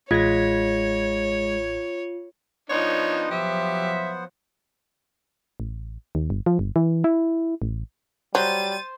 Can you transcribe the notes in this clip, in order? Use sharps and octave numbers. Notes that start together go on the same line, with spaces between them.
A1 G#3 F4 C#5 G#6 A#6
F3 B3 D4 D#4 C5 C#5 F#5
F3 F#3 G4 E5
A1
D#2
G1
F3
G1
E3
E4
A1
F#3 G3 C5 A6 D#7